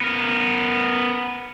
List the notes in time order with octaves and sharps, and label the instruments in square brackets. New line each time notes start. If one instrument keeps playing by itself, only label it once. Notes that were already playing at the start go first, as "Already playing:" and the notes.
[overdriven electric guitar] B3 A#4